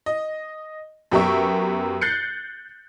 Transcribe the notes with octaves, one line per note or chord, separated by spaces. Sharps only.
D#5
F#2 B3 G4 A#4 E5 C#6
F#6 G6 A6 C7 C#7